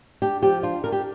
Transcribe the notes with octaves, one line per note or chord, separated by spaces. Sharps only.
D4 G4
F3 G4
D4 F4
D4 A#4
G4